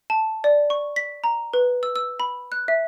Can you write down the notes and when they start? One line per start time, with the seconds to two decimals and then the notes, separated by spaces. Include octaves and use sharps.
0.10 A5
0.44 D5
0.70 C#6
0.96 B6
1.24 A#5
1.54 B4
1.83 E6
1.96 E6
2.20 B5
2.52 F#6
2.68 E5